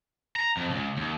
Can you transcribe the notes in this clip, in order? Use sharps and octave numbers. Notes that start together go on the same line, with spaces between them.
A#5
F2
C#2
D#2